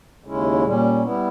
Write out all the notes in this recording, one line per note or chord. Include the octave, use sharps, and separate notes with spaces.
D#2 C#3 G#3 C#4 E4
A#2 G3 C#4
G3 B3 E4